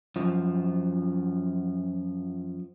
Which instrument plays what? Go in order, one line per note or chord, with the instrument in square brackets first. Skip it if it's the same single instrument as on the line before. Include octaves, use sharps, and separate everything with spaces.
[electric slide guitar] F#2 F3